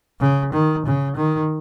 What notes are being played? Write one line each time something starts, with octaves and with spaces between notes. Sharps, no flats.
C#3
D#3
C#3
D#3